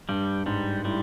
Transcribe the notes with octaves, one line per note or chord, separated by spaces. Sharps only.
G2 G3
G#2 G3
A2 G3